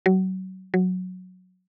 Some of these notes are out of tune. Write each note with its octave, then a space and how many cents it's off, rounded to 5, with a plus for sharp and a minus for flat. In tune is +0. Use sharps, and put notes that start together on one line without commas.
F#3 +25
F#3 -10